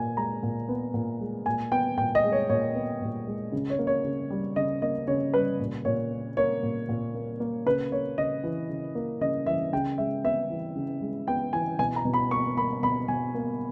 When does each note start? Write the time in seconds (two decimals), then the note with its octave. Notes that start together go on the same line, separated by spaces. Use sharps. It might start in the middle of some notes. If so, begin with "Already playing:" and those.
Already playing: A#2 G#5
0.17 G#3 A#5
0.43 A#2
0.69 B3
0.94 A#2
1.21 G#3
1.46 A#2 G#5
1.72 B3 G5
1.98 A#2 G5
2.15 D#5
2.24 G#3
2.32 C#5
2.49 A#2 C#5
2.75 B3
3.02 A#2
3.27 G#3
3.52 C#3
3.70 C#5
3.79 A#3
3.87 C#5
4.04 C#3
4.30 G3
4.56 C#3 D#5
4.82 A#3 D#5
5.07 C#3 C#5
5.33 G3 B4
5.60 A#2
5.85 A#2 C#5
6.11 A#3
6.37 A#3 C#5
6.63 A#2
6.89 A#2
7.14 A#3
7.40 A#3
7.66 C#3 B4
7.92 A#3 C#5
8.18 C#3 D#5
8.44 E3
8.69 C#3
8.95 A#3
9.21 C#3 D#5
9.46 E3 E5
9.73 C#3 G5
9.98 G#3 E5
10.24 B3 E5
10.50 E3
10.75 C#3
11.01 G#3
11.28 B3 G5
11.53 E3 G#5
11.79 B2 G#5
11.96 A#5
12.05 B2
12.14 B5
12.31 A#3 C#6
12.57 A#3 B5
12.83 B2 B5
13.08 B2 G#5
13.35 A#3